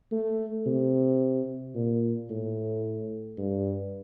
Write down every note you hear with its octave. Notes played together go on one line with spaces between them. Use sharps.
A3
C3
A#2
A2
G2